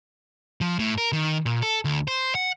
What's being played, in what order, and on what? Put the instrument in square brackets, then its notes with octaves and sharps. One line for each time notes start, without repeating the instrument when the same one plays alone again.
[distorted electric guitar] F3
A2
A#4
D#3
A#2
A4
D2
C5
F#5